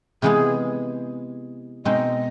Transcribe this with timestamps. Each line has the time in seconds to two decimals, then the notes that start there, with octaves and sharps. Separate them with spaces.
0.22 C3 E3 G#3 B3 G#4
1.85 B2 G#3 C4 D#4 D#5